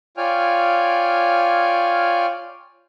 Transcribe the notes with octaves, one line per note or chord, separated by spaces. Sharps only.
F4 C#5 D5 G5 G#5 F6